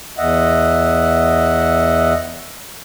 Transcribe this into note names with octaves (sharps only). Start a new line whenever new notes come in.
E2 D#5 E5 F#5